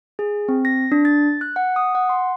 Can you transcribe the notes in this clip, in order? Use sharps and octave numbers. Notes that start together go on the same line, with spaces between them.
G#4
C4
A#6
D4
A6
F#6
F#5
D#6
F#5
C6